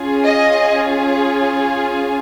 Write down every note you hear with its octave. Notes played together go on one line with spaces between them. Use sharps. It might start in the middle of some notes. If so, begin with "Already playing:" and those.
Already playing: C#4 F4 G#4
D#5